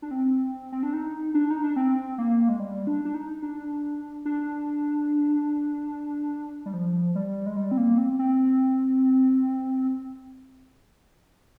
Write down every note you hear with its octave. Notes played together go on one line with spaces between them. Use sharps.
D4
C4
C4
D4
D#4
D4
D#4
D4
C4
A#3
G#3
G3
D4
D4
D#4
D4
D4
G3
F3
G3
G#3
G3
C4
A#3
C4
C4